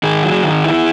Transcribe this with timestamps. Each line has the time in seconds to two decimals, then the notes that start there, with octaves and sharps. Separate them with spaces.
0.03 D#3 G#4
0.23 F#3
0.44 D#3
0.64 E4